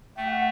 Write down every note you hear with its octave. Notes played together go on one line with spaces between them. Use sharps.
A3 G5
F#5